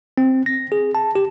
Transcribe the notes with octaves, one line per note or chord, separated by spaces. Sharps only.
C4
A#6
G#4
A5
G4